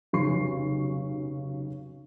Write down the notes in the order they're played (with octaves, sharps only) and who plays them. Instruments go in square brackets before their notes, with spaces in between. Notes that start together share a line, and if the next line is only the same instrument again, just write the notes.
[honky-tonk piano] F1 B1 C#3 C#6 C7